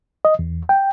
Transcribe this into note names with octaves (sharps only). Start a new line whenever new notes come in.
D#5
E2
G5